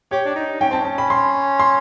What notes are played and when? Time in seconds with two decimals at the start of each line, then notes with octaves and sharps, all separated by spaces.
0.11 G4 C#5
0.25 D4
0.35 D#4
0.61 C#4 G5
0.70 C4 A5
0.80 C#4 A5
0.98 B5
1.10 C6
1.60 C6